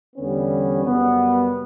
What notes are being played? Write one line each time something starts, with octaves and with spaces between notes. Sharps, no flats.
E2 D3 G3 B3 C#4
F#2 C#3 G3 B3